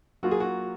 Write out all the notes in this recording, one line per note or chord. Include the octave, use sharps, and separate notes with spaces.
F#3 A#3 F4 F#4
G#4
F#4